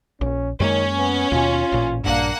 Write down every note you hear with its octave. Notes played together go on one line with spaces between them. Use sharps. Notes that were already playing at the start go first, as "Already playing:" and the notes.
A#1 C#4
F#2 D#3 G#3 A#3 C#4
B3
D#2 B2 F4
A1 A#2
A#1 G2 A#3 D4 F#5